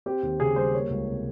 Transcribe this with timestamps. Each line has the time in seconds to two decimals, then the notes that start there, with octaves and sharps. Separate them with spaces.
0.06 C4 G4
0.23 D#2
0.40 C#3 G#4
0.56 G3 C5
0.74 A#3 C#5
0.90 C#2
1.08 C3